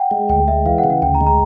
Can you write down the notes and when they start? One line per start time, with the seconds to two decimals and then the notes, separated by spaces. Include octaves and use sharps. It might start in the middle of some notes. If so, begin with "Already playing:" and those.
Already playing: F#5 G5
0.11 G#3
0.30 D2 G5
0.48 G#3 E5
0.66 E3 F5
0.78 F#5
0.84 C#3
0.90 F#5
1.02 D2 G5
1.15 A#5
1.21 G#3
1.26 A#5